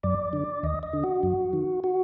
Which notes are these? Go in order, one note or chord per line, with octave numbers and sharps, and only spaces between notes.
F#2 D5
D3
D#2 D#5
D#5
D3
F#4
F#2
D#3
F#4